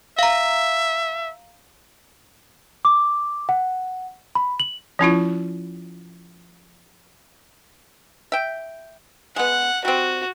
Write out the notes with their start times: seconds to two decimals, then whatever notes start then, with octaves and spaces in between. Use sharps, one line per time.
0.19 E5 F5 A#5
2.85 D6
3.49 F#5
4.35 B5
4.60 F#7
4.99 F3 C#4 E4 F4
8.32 E5 G5
9.36 G#3 B3 F#5
9.85 G3 C4 F#4